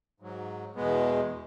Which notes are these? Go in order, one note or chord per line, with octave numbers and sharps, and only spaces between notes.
G#2 F#3
E2 B2 G#3 B3